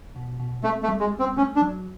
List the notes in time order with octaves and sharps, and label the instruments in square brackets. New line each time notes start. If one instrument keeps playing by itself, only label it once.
[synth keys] B2
B2
[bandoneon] A3 [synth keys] C4
[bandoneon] A3
[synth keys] G3
[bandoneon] G#3
[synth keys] G3
[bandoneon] C4
[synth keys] A3 [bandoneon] C#4
[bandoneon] D4
[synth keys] F#3